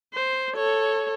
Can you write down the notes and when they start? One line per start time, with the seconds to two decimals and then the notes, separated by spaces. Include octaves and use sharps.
0.14 C5
0.55 A4 C#5